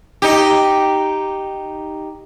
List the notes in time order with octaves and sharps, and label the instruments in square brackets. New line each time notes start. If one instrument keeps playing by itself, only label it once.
[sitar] D#4 G4